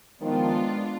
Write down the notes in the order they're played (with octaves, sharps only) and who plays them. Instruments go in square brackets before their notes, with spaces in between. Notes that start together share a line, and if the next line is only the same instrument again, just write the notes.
[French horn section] D#3 F3 [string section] G#3 B3 D4 F4